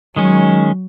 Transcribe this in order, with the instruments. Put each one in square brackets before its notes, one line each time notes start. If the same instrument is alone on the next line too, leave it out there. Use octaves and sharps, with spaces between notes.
[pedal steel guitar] D#3 G#3 C#4 [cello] F#3